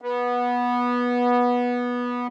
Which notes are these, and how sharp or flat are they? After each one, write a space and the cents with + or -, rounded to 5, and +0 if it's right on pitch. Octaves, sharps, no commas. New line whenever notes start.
B3 -15